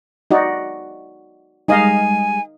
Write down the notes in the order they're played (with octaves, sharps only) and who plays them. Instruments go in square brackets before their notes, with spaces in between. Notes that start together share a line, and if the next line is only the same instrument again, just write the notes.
[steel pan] D#4 F#4 D5
[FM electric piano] G3 G#3 [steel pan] D#4 D#5 F5 [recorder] G#5